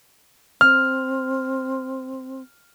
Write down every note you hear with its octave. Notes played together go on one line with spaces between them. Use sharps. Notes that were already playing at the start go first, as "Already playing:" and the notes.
C4 F6